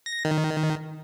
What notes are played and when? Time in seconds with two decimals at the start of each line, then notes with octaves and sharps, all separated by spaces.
0.06 A#6
0.25 D#3